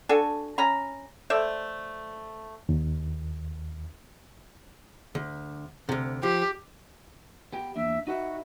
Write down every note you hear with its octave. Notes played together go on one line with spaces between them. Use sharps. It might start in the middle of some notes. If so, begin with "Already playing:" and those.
D4 F#4 A4 G#5
C#4 A#5 B5
A3 C5 D5 E5
D#2
D2
D2 C3
F3 G4
B3 G4 G5
E2 A#3 D4 E5
D#4 F#4 B4 E5